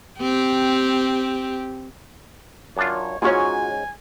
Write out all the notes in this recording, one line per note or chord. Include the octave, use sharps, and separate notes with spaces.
C4 G4
F#2 D4 F4 C#5
G#2 C#4 F4 F#4 C#5 G#5